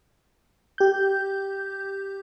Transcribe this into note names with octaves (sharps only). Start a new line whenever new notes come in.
G4 G6